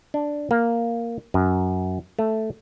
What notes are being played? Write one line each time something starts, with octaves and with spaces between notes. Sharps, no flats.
D4
A#3
F#2
A3